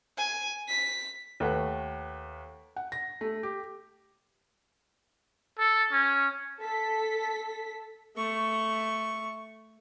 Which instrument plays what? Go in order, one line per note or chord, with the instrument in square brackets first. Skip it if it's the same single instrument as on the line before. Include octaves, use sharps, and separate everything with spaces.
[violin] G#5
B6
[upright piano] D#2 A3 B4 F#5
[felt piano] F#5
A#6
A3
G4
[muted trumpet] A4
C#4
[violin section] A4 B6
[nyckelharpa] A3 C#6